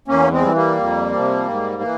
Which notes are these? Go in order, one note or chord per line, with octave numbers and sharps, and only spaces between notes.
E2 A#3 C#4
G#3 C4
E3 G3
G3 A#3
F2
C3 F3
G#2
E3